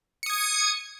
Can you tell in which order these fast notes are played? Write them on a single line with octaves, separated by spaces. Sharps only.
C#7 D#6 G#6